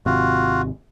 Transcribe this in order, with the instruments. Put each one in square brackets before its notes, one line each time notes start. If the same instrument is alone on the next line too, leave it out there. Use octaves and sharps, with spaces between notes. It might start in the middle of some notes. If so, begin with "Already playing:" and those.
[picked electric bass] G#1 C3 [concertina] F4 F#4